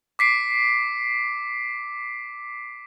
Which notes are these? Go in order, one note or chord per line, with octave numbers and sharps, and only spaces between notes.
D6 B6 C7 D7